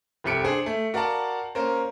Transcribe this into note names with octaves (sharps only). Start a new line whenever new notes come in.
F1 C2 G4 C#7 D7
D4 G#4 C5
A3
F#4 A#4 D5 F5 F#5 A5
A#3 C#4 A#4 C5